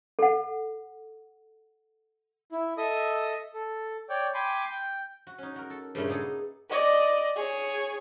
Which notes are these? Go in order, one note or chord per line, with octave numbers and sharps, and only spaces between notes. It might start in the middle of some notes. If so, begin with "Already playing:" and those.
A4 F#5
E4
A4 D#5 E5 D#6
A4
C#5 D5 G5
G5 G#5 B5 C6 D6
G5 G6
F#4
C#4 D#4
F#4 A#4
A4
G2 A#2 C#3 A3 A#3 D#4
A#3 B3 D#4 G#4 A4
D5 D#5
G#4 C#5